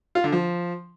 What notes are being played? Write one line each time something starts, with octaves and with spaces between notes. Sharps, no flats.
F4
D3
F3